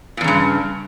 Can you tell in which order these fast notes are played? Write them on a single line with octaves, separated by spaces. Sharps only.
A#2 E2 C#3 G2